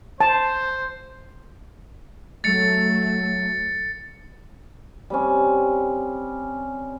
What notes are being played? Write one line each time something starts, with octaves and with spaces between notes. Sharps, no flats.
C5 A5
F#3 A3 A6 C#7
G3 C4 C#4